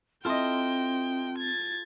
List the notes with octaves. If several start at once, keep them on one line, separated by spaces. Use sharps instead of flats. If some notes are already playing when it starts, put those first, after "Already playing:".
C4 E4 F4 A4 D#5 G5 C6
G#6 A6